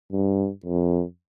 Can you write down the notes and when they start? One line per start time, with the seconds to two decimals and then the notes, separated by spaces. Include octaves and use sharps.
0.12 G2
0.66 F2